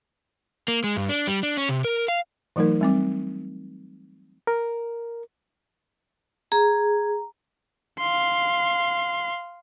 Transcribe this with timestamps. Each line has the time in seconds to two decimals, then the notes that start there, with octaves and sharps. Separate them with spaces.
0.68 A#3
0.84 G#3
0.97 G2
1.09 D4
1.27 G3
1.43 D4
1.57 C#4
1.69 C3
1.84 A#4
2.08 F5
2.56 E3 F#3 A3 D#4 A#4
2.81 G3 C4 D6
4.47 A#4
6.52 G#4 A#5
7.99 F5 C6